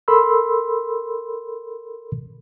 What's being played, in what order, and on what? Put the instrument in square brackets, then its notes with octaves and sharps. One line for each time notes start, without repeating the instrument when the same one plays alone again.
[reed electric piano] A4 A#4 B5 C6 E6